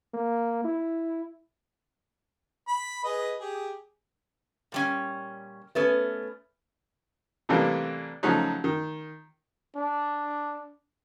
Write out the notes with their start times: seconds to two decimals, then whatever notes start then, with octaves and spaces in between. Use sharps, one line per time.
0.14 A#3
0.65 E4
2.68 B5
3.04 G#4 B4 D#5
3.38 G4 G#4
4.72 A#2 G3 C#4
5.75 A3 B3 C#4 B4
7.49 A2 C3 E3 G3 A#3 D4
8.23 C#3 F3 F#3 A3 D#4
8.64 D#3
9.76 D4